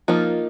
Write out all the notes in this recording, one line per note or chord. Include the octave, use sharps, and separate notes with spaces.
F3 A#3 D#4 F4